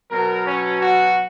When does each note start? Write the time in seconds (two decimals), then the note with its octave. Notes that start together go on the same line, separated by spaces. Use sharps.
0.11 B2 F#3 A#4
0.45 C#4
0.80 F#4